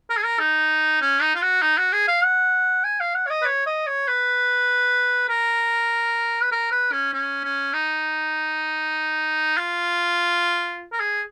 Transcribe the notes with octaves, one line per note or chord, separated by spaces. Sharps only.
A#4
G#4
A#4
D#4
C#4
D#4
F4
F#4
D#4
F#4
G#4
F5
F#5
G#5
F5
F#5
C#5
D#5
B4
C#5
D#5
C#5
B4
A#4
B4
A#4
B4
C#4
C#4
C#4
D#4
F4
A#4
G#4